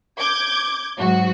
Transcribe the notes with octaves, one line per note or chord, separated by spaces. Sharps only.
D6 G6 G#6
G#2 F#3 F#4